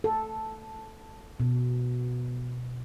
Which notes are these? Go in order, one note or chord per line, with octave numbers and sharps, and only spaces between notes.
A4
B2